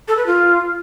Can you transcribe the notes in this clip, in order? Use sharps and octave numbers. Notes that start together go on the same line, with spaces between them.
A4
B4
F4